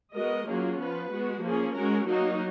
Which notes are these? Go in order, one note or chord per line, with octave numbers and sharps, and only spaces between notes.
G#3 B3 F#4 A#4 D#5
F#3 A#3 C#4 F4 G#4
F3 B3 F4 B4
G#3 B3 F#4
F3 A#3 C#4 G#4
G#3 C#4 F#4 A#4
F#3 A#3 D#4 F#4